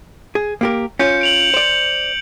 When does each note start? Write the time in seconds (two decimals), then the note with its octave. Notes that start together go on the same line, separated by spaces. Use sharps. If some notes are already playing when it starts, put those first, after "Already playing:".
0.35 G#4
0.61 A#3 G4 A#4
0.99 C#4 F4 G6 C#7
1.21 D7 F7 F#7
1.54 C5 D5